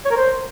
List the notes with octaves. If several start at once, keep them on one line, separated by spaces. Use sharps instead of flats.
C#5
A#4
C5